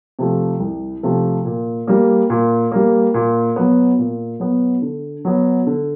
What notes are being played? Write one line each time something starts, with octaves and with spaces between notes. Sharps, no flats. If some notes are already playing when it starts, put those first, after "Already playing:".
C3 F3 A3
C2
C3 F3 A3
A#2
G3 A#3
A#2
G3 A#3
A#2
F#3 B3
A#2
F#3 B3
D3
F#3 B3
D3